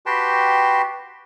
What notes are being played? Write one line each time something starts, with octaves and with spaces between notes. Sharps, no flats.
F#4 G4 B4 G5 A5 C6